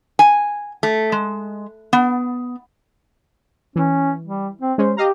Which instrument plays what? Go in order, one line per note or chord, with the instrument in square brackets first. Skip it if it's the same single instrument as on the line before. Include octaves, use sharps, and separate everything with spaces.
[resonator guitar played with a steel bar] G#5
A3
G#3
B3
[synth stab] E3 [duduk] C#4
[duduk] G3
C4
[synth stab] G#3 C#4 [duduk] C5
[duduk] G4 [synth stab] D#5 F5 A#5